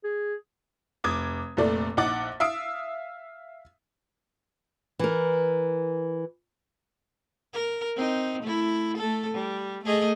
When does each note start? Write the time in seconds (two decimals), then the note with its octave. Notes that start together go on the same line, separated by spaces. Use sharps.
0.04 G#4
1.04 F1 D6 D#6 G#6
1.57 F1 A#2 A3 D5
1.97 A#1 D#4 F#5 D6 A6 F#7
2.40 E5 F5 D#6 E6 D7
4.99 E3 A#4
7.53 A#4
7.96 C4 D#4
8.43 A3 E4
8.97 A3 A4
9.34 G3
9.84 A3 G#4 D#5